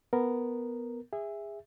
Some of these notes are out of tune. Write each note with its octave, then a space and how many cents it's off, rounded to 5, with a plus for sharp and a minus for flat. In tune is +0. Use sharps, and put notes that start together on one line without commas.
B3 +0 A#4 +0
G#4 -25 E5 +0